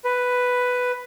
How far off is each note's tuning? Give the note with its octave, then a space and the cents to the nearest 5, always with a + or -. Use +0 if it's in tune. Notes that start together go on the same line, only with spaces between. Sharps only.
B4 +5